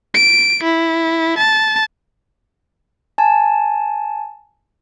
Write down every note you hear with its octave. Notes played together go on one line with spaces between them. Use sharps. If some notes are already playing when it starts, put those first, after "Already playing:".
D7
E4
A5
G#5 A5